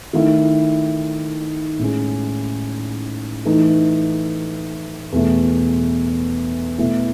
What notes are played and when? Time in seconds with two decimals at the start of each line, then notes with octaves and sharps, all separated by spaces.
0.13 D#3 A3 E4
1.79 A2 G#3 C#4
3.45 E3 A3 D#4
5.12 E2 B2 A3
6.78 B2 A3 E4